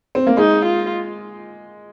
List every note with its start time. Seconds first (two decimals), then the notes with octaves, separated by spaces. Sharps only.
0.15 C4
0.27 A#3
0.37 G#3 D#4
0.65 F4